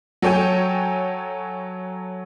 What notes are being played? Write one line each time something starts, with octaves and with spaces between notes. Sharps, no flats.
F#3 A4 C#5 G5 G#5